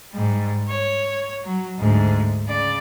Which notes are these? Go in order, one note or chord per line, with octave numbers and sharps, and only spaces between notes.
G#2 G3
C#5
F#3
D2 G#2
C#3 D5